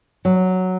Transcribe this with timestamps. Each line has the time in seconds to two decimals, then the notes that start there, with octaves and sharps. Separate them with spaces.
0.25 F#3